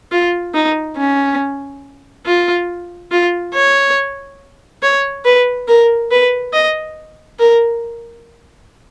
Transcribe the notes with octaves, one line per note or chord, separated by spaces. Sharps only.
F4
D#4
C#4
F4
F4
C#5
C#5
B4
A#4
B4
D#5
A#4